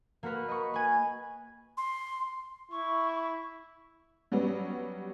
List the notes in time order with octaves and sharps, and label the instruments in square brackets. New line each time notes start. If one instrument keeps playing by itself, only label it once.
[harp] A#3 F#4 A#4 B4
D#5 B5 C#6
B4 G#5
[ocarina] C6
[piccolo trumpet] E4 [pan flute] C#6
[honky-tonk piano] F#3 G3 B3 C#4